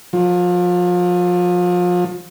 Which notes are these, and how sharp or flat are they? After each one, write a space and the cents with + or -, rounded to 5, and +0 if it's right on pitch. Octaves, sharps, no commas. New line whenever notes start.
F3 +30